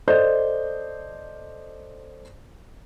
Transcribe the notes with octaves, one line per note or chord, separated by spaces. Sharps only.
A4 C5 D5 D#5 G6